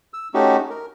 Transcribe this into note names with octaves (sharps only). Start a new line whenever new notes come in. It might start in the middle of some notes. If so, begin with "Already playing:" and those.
E6
A3 C#4 D#4 F#4 G4
A#4